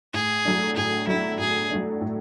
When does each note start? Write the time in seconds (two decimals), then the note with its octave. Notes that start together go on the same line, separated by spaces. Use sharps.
0.14 A2 G#4
0.45 F#3 A3 D4
0.76 A2 G#4
1.07 F#3 A3 D4 E4
1.39 A2 G#4
1.70 F#3 A3 D4
2.01 A2